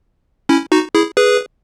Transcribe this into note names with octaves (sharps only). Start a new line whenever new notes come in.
C#4 E4
D#4 F#4
E4 G#4
G#4 B4